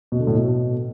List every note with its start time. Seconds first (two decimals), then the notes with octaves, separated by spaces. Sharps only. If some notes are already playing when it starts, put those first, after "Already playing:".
0.12 B2
0.20 D3
0.27 A2
0.35 B2